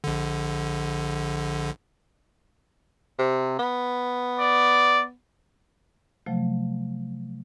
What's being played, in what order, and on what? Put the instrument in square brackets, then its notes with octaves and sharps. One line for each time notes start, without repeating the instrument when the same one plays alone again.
[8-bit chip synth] A#1 D3
[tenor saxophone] C3
B3
[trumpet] D5
[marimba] C3 F3 F#3 A3